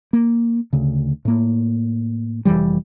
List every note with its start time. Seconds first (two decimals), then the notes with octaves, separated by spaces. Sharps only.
0.13 A#3
0.73 D2 C#3
1.25 A2 A#3
2.45 F1 D2 E3 G3